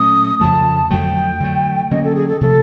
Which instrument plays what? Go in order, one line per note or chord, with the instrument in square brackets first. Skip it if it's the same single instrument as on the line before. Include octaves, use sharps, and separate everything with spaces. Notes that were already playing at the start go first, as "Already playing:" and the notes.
Already playing: [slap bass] A#2 F#3 A3 C#4 [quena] D#6
[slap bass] F2 C#3 F3 A3 [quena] A5
[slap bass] F2 D3 F#3 A3 [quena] G5
[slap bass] D3 F#3 A3
[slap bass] D3 F#3 A#3 C#4 [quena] D#5
[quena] A4
G#4
A4
[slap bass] C3 F3 A3 [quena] A4